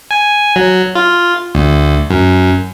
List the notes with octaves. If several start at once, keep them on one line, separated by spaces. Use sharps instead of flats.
G#5
F#3
F4
D2
F#2